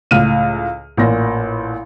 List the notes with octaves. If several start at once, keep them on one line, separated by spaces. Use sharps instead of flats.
C#2 A2 F6 D#7
A1 A#2 A#6